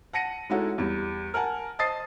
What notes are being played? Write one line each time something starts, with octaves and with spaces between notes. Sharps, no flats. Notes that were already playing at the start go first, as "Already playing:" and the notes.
F#5 A5 A#6 C#7 D#7
G#3 C#4 D#4 E4 F#4 A4
E2 G3
A#4 F#5 G#5 A5
C5 D#5 A5 D#6 A6 C7